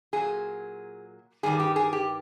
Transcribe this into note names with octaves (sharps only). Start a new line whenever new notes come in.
A#2 F#3 G#4
G2 D#3 G3 G#4
G4
G#4
G4